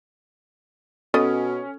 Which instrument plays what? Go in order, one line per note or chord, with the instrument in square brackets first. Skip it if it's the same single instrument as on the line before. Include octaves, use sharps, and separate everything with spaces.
[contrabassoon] B2 [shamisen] B3 D#5 [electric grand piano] C#4 [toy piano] A4